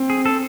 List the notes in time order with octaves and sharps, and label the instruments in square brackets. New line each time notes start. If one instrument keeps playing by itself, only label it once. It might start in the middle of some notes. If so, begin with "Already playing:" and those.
Already playing: [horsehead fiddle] C4
[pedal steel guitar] G#4
A4